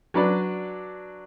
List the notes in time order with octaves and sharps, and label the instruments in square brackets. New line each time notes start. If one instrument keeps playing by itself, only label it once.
[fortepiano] F#3 D4 B4 D5